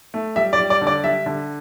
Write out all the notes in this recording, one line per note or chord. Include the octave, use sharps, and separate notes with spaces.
A3
G3 E5
D5
G3
D5
D3
D5
G3 E5
D3